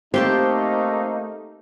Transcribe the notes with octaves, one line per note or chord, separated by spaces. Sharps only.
A3 A#3 C4 D#4 G4 C5 G5 A5